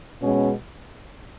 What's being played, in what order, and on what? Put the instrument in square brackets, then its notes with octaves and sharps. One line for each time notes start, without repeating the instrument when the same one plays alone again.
[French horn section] B2 G#3 B3 C#4